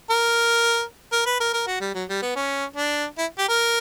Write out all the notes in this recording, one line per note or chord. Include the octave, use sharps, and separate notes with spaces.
A#4
A#4
B4
A#4
A#4
F#4
G3
F#3
G3
B3
C#4
D4
E4
G4
A#4